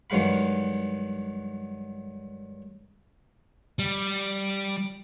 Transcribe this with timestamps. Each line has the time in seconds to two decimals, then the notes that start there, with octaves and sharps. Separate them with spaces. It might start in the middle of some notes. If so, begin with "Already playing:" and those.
0.10 G2 D#3 F#3 G#3 F5 B5
3.79 G3